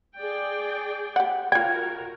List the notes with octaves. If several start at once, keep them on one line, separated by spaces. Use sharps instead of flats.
G#4 D5 G5
G4 F#5
F4 F#4 A#4 G5 G#6